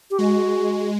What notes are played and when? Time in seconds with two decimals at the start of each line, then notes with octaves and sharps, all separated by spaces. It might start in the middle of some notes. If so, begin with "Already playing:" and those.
0.11 G4
0.18 G#3 F#4